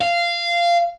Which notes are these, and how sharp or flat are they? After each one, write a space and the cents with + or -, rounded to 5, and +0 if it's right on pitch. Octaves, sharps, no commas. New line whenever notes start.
F5 -15